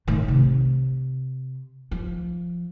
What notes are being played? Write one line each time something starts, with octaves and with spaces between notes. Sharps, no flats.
A2 D#3
C3
F3